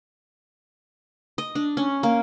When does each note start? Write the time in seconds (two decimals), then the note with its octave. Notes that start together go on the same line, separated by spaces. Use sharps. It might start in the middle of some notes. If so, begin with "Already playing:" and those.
1.38 D#5
1.55 D4
1.77 C#4
2.03 A#3